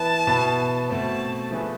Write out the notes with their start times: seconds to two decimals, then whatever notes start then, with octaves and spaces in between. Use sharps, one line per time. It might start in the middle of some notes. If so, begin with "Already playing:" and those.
Already playing: E3 B3 E4 B4 A5
0.27 B2 B3 E4 B4
0.89 B2 A3 C4 A5
1.51 F3 A3 D4 G#4 B4